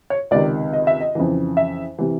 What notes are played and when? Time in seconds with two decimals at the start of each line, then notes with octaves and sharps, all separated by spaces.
0.10 C#5
0.31 C#2 C3 D#3 D5
0.73 D#5
0.87 E5
1.00 D#5
1.15 F2 C#3 E3
1.57 E5
1.98 C3 E3